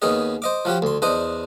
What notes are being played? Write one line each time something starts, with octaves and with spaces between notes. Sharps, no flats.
D#2 B3 C#4 G#4 D#5
C5 D#5 D6
F3 C#4 F#4 G4
D2 C6
E2 D4 C5 D#5 D#6